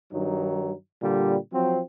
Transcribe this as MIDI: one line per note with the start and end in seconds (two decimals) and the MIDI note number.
0.13 0.72 43
0.13 0.72 51
0.13 0.72 54
0.13 0.72 63
1.02 1.36 46
1.02 1.36 50
1.02 1.36 55
1.53 1.80 53
1.53 1.80 54
1.53 1.80 60